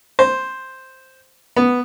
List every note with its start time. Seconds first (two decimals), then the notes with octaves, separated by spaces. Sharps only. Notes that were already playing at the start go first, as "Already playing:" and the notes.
0.19 C5
1.56 B3